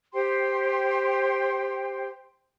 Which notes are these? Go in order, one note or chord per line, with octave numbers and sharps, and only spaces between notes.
G4 C5 G5 C6